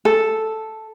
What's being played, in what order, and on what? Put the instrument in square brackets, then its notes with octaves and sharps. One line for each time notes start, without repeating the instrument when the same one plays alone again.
[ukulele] A4